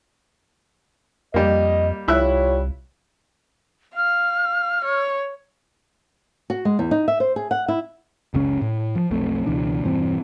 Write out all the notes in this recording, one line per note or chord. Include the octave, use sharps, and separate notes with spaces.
F2 G3 A#3 D#5
C2 G3 E4 F4 C#5 E5 F#6
F5 F6
C#5
F#4
G#3
E2
D#4
E5
C5
G#4
F#5
E4
F#1 C#2 C#3 C#4
A2
F3
B1 F2 A3 C4
C#2 B2 E3 D4
E1 G2 E3 C4